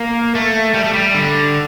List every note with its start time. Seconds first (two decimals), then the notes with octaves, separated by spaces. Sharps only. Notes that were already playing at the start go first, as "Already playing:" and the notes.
Already playing: A#3
0.35 A3
0.74 G3
0.84 A3
0.93 G3
1.15 D3